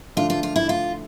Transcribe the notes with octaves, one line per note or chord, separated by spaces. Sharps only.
D3 F3 A3 D4 F4
F4
F4
E4
F4